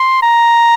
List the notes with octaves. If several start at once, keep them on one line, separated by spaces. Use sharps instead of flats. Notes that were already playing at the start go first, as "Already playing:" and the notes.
Already playing: C6
A#5